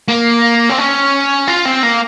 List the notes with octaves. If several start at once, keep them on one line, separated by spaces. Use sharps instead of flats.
A#3
C4
C#4
F4
C4
A#3